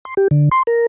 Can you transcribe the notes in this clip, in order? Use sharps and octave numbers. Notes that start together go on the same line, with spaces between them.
C6
G4
D3
C6
A#4